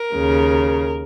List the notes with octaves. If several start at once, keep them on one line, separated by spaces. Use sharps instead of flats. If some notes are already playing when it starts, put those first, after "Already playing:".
Already playing: A#4
D#2 C#3